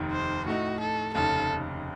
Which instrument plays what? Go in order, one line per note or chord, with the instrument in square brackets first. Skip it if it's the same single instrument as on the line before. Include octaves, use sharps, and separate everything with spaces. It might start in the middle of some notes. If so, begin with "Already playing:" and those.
Already playing: [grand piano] F1 D#2 D#3
[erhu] C5
[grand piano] A2 A3 D#4 [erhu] F#4
[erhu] A4
[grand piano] F1 D#2 C#3 [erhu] A4